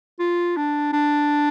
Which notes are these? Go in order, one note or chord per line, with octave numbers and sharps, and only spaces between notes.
F4
D4
D4